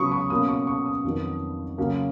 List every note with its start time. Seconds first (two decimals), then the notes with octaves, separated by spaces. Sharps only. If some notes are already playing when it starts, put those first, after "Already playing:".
Already playing: C#3 F#3 B3 B5 C#6 D#6
0.12 C#6
0.30 B2 A#3 C#4 D#6
0.48 C#6
0.67 C#6
0.86 D#6
1.04 F2 D#3 F#3 B3
1.78 C#3 F#3 A#3 C#4